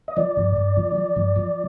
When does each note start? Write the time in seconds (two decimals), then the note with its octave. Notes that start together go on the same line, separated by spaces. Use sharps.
0.08 D#5
0.17 F3 D5
0.37 G2
0.56 G2
0.77 F3
0.96 F3
1.16 G2
1.36 F3